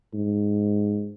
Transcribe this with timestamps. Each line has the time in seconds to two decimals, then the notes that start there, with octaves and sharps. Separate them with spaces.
0.14 G#2